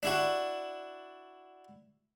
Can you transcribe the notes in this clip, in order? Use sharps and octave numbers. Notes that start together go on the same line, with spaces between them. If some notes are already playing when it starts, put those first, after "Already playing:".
D4 E4 F#4